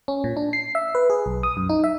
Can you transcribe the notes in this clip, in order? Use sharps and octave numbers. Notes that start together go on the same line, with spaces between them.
C#4
A#2
D4
C7
E5
B4
G#4
B1
D#6
F#2
D#4
E5